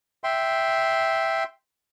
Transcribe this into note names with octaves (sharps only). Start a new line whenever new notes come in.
E5 G5 C6